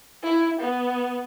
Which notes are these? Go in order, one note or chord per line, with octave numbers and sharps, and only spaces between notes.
E4
B3